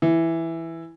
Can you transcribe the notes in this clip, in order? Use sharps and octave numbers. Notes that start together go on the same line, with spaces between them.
E3